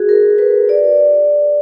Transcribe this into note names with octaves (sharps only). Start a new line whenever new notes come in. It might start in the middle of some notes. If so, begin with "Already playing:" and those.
Already playing: F#4 G#4
A#4
B4
D5